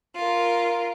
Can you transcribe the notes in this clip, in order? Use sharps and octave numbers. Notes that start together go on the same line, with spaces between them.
F4 A#4